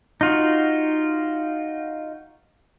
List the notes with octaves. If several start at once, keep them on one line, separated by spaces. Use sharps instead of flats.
D#4 F4 F#4